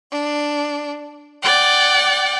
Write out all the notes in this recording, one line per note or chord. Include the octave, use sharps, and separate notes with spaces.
D4
D5 F#5 G5